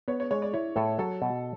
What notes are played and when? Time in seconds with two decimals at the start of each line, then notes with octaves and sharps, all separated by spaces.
0.08 B3 C#5
0.20 C#5
0.31 G#3 C#5
0.42 D5
0.53 E4 C#5
0.76 A2 A4
0.98 F#3 A4
1.22 B2